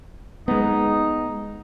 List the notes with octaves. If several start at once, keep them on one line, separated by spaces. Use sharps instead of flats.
G#3 B3 D#4